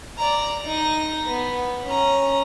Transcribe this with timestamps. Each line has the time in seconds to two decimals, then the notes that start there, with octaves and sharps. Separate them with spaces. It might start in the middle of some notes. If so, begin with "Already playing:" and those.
0.18 D5 A#5
0.65 D#4 A#6
1.26 B3
1.85 C#4 A#5